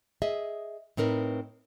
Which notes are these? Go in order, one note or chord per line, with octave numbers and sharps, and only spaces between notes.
G#4 D#5 E5
A2 C4 D#4 A#4 B4